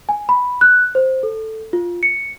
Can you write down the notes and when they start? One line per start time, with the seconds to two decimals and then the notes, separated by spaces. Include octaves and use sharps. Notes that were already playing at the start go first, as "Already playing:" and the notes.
0.09 G#5
0.29 B5
0.61 F#6
0.95 C5
1.23 A4
1.73 F4
2.03 C#7